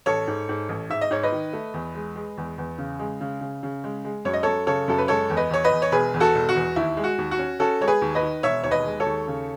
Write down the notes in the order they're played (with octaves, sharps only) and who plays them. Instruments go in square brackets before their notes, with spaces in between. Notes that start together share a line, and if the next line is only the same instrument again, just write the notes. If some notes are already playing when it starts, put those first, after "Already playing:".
[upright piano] A1 A4 C#5
G#2
G#2
A1
G#2 E5
D#5
G#2 C#5
B4 D#5
D#3
A3
E2
G#3
G#3
E2
E2
C#3
G#3
C#3
C#3
C#3
G#3
G#3
F#2 C#5
D#5
F#2 A4 C#5
C#3 A4 C#5
F#2 A4
B4
G#3 A4 C#5
E2
B4 D#5
E2 C#5
B4 D#5
E2
C#5
E1 G#4 B4
E2
F#4 A4
E1
F#4
E2
D#2 E4
G#3
F#4
D#2
F#4
C#4
C#4 F#4 A4
G#3 C#5
G#4 B4
D#2
B4 D#5
D#3
E1 C#5 E5
D#2 C#5
B4 D#5
G#3
A4 C#5
D#2
C#3